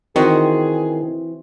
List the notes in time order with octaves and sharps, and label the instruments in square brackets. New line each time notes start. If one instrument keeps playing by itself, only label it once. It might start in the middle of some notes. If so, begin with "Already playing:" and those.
[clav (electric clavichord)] D#3 [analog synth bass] E3 [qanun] C4 F#4 D#5 [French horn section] G#4